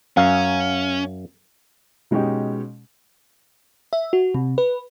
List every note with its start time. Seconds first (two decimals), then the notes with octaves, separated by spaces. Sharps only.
0.17 F#2 C#4 F5
2.11 B2 G#3 C#4 D#4 G4
3.93 E5
4.13 F#4
4.35 C3
4.58 B4